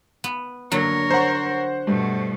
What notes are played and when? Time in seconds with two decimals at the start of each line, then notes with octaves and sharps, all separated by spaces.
0.24 B3
0.72 D3 F#3 A#3 A#4 C#5
1.11 C5 F#5 A#5 C#6
1.87 G2 B2 A3